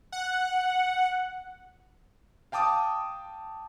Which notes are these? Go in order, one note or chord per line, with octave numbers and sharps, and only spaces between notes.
F#5
F5 G5 A5 D6 D#6